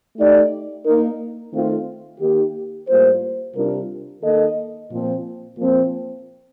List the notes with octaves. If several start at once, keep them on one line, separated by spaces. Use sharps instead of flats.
A3 D#4 G4 D5
A#3 D#4 A#4
D#3 A3 C4 F4
D#3 A#3 D#4 G4
A2 G3 A#3 F4 C5
C3 G3 D4 F4 A#4
D#3 A#3 D#4 A4 D#5
A#2 F3 C4
A#2 F3 C4